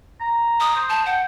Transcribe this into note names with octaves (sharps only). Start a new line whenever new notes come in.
A#5
D#6
C5
A5
F#5 G5